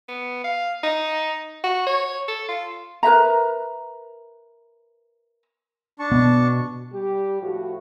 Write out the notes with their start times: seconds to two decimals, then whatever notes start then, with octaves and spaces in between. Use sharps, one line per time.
0.08 B3
0.44 F5
0.83 D#4
1.64 F#4
1.87 C#5
2.28 A4
2.48 F4
3.03 A#4 B4 E5 A#5
5.99 D4 A5 C#6
6.12 B2 B3
6.93 G3 G4
7.41 A2 F3 F#4